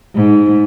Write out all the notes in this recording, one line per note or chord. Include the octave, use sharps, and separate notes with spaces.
G#2